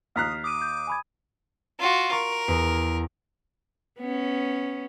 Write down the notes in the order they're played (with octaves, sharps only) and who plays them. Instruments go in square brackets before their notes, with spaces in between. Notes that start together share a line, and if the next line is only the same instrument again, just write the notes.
[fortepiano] D#2 A#5 F#6 [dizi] D#6 [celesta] F6 B6 C7
[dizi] D6 [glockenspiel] D#6 D#7
[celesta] G6
G#5 B5 G#6
[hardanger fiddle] F4 F#4
[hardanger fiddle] A#4 [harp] C#6
[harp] E2
[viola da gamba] B3 C#4